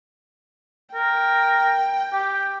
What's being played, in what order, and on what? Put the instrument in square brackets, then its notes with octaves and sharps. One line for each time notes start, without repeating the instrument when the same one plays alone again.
[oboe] A#4 [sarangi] G5
[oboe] G4